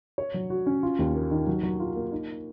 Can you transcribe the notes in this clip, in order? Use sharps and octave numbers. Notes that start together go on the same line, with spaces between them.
C#5
F#3
F#4
C#4
F4
D#2
A#3
D#3
F#3
F#3
F4
A#3
D#4